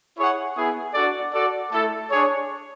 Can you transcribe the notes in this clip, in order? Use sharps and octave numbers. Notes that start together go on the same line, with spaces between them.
E4 G#4 C#5 F#5
B3 E4 G#4
D4 F#4 A4 D5
F#4 A4 D5
A3 E4 A4
D4 G#4 C#5